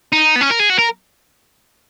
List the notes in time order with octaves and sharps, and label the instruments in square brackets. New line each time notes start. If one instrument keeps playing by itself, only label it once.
[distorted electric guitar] D#4
B3
C#4
A#4
G#4
F#4
A#4